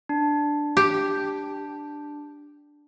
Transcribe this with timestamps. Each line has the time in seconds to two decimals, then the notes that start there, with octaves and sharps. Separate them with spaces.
0.09 D4
0.77 G4